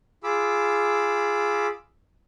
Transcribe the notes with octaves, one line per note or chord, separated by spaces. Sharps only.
F4 G#4 B5 D6 E6